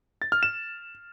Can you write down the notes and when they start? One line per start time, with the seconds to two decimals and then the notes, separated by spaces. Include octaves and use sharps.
0.22 A6
0.32 F6
0.43 E7